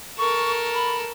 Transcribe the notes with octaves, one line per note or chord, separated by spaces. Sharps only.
A4 A#4 C#6
B5